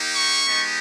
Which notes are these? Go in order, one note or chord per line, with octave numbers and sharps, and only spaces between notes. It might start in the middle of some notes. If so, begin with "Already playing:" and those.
Already playing: A#3 D#4 G4
C#6
G#3 B3 D#4 G4